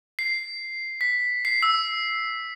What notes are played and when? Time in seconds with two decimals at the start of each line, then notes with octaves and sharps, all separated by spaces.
0.19 C7
1.01 B6
1.45 C7
1.63 E6